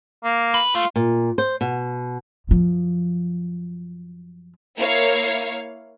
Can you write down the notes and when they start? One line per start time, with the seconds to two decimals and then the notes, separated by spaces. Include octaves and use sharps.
0.24 A#3
0.54 B4
0.75 A3 F4
0.96 A#2
1.38 C5
1.61 B2
2.49 F#2 F3
4.76 A#3 E4 C#5 F5